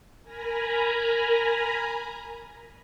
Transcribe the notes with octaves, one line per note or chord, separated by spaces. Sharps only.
A#4 G#5 A#5 B5